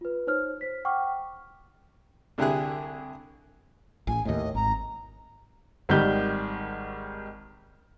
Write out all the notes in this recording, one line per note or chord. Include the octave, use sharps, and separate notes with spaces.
F4 B4
D#4 C5 C#5 F6
C5 B6
F#5 G5 C#6 D6 F6
C2 D3 E4 G4 G#4 F#6
A1 G#5
D#2 A2 D#5
G#1 A#5
G#1 D#3 G3 G6